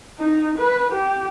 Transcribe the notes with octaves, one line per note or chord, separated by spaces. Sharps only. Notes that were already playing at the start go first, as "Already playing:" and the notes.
D#4
B4
G4